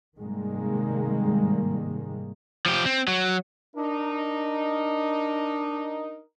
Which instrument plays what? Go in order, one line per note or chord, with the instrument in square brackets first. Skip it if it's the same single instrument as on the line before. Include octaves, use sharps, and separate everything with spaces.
[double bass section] G#2 C3 D#3 G3 G#3 A#3
[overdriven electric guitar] F3 G4
C4
F#3
[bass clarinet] D4 [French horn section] D#4 A#4